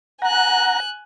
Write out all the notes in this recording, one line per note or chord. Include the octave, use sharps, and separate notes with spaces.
F#5 G#5 A#5 F#6